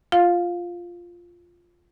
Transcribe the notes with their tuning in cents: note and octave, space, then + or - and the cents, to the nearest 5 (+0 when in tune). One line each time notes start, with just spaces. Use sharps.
F4 +0 F5 +10